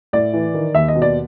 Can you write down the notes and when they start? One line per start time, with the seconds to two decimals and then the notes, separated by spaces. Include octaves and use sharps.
0.13 A2 D5
0.33 E3
0.54 D#3
0.75 D#2 E5
0.88 D#5
0.95 B2
1.02 D5